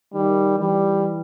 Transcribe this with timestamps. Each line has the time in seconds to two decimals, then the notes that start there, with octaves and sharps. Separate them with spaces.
0.14 D#3 G3
0.58 E3 G3